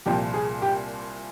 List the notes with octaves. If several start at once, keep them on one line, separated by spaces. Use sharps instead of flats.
C2 A#2 F3 G4
G#4
G4